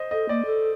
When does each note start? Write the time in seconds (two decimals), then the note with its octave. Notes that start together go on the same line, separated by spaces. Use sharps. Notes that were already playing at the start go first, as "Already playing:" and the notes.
Already playing: C5 D#5
0.11 A4 D#5
0.29 A#3 D5
0.46 A4